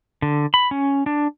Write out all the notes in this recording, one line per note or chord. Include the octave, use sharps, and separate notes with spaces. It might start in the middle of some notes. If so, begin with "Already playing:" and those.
D3
B5
C#4
D4